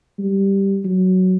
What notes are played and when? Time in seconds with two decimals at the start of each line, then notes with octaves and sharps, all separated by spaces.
0.19 G3
0.84 F#3